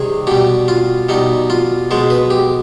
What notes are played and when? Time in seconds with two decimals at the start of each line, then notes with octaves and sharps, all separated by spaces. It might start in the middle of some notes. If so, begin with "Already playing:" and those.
Already playing: C3 D#3 G3 G#4
0.27 B2 G3 G4
0.68 F4
1.09 B2 G3 D#4
1.50 F4
1.91 B2 G#3 C5
2.10 B4
2.30 G4